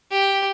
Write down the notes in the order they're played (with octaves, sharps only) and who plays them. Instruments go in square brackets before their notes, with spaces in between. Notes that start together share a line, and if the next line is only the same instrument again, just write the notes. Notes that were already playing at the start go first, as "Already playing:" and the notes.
[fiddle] G4